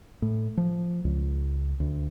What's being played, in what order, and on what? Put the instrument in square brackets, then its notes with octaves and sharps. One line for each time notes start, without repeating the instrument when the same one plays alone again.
[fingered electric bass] A2
F3
C#2
D2